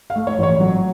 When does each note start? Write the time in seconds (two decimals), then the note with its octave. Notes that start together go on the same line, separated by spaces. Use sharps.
0.10 F5
0.16 A3
0.27 C#5
0.38 A1
0.43 C#5
0.60 F#3